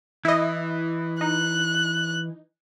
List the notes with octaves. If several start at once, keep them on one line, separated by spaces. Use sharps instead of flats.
E3 E4 D#5
D#4 F#6